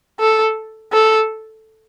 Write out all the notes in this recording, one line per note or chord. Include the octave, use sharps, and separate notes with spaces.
A4
A4